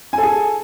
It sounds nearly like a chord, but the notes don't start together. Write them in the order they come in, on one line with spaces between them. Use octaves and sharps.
G#5 A4 G#4